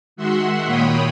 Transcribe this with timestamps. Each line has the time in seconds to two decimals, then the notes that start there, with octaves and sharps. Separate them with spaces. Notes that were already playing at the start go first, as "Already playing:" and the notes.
0.16 D#3 G#3 F#4 E5 F#5 C6
0.65 A#2 A#3 C#5 G5 B5 D#6